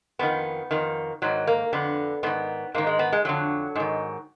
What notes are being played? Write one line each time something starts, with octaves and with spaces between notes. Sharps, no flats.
F2 D#3 B3
F2 D#3
G#2 D#3 F#3
A#3
F2 D3 B3
G#2 D#3 B3
G#2 D#3 A#3
G#3
B3
G#3
F2 D3 F#3
G#2 D#3